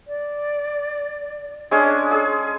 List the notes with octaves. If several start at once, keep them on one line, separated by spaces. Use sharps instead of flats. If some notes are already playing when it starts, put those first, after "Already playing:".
D5
G#3 C#4 D4 G#4
G#4